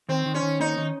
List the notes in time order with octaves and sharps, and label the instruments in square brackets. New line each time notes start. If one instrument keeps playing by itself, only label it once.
[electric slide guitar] D#3 [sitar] C4
[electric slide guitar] D#3
[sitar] C#4
[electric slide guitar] D#3
[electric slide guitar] A#3 [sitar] D#4
[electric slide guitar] D#3